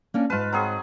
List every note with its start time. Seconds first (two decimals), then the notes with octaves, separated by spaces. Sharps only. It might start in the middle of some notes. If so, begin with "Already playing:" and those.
0.14 A#3 C#4 D4
0.30 G#2 F4 B4 A5
0.53 F#3 C4 G#4